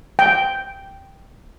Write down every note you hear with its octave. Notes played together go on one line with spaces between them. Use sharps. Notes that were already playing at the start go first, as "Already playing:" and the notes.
G5